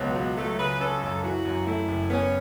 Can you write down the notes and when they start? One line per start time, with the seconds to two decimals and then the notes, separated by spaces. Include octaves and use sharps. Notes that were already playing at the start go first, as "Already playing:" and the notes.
Already playing: C#2 B2 F#3 B3
0.16 C#2
0.37 F#3 A3
0.59 C#3 B4
0.80 C#4 A4
1.02 F#2 A4
1.24 E3 F#4
1.45 F#2
1.66 A3 E4
1.88 F#1
2.10 B3 C#4